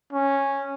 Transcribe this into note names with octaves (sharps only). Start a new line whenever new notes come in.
C#4